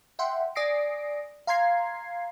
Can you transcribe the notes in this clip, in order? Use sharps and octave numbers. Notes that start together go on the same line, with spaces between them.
E5 F#5 G5 C6
D5 G#5 D#6 A#6 C7 D7
F5 A#5 C6 G#6 C7